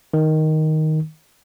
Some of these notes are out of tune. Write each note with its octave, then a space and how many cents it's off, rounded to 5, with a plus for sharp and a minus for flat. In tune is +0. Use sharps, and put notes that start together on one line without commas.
D#3 +5